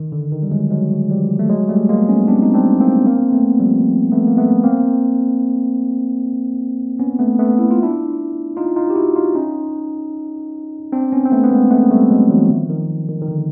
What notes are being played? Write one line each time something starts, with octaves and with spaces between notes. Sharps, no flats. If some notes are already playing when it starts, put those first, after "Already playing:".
Already playing: D#3
D3
D#3
G3
F#3 G#3
F#3 G#3
F3 G3
A3
F#3 G#3
G3 A3
G#3 A#3
B3 C#4
C4 D4
D#4
C4 D4
A#3 C4
A#3 C4
A3 B3
F3 G3
A3 B3
A#3
A3 B3
A#3 C4
B3 C#4
A3 B3
A3 B3
E4
F4
D4 E4
D#4 F4
D#4 F4
G4
E4 F#4
D#4 F4
C#4 D#4
C4 D4
B3 C#4
C4
A3 B3
B3
G#3 A#3
A3 B3
G3 A3
F#3 G#3
E3 F#3
D#3 F3
D#3
D#3
D#3
D3